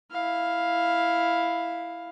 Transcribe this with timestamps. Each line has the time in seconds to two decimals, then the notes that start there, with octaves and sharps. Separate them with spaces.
0.11 E4 F5